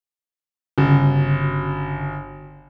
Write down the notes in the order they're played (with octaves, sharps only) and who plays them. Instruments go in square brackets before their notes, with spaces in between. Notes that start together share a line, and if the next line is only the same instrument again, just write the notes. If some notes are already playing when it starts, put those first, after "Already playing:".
[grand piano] G1 [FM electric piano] C#3 F#4